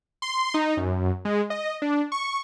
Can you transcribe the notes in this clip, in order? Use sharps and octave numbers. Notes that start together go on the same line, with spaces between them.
C6
D#4
F#2
G#3
D#5
D4
C#6